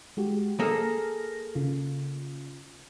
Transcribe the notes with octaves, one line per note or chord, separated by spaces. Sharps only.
G#3 F#4 G4
A#3 G#4 A4 F6 A#6
C#3 F4